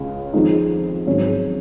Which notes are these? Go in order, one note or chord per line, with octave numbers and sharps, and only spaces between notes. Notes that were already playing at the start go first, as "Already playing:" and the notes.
Already playing: C#2 C#3 G#3
F2 D#3 G#3 D#4
G#1 G#2 F#3 C#4 G#4